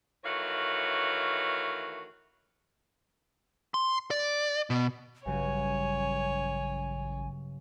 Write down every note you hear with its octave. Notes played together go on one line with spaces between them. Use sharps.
D#3 E3 A3 F#4 C#5 F5
C6
D5
B2
A1 G2 C#3 F#3 C#5 G#5